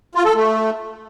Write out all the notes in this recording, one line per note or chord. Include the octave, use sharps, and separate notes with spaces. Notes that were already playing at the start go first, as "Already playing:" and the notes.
F4
A4
A3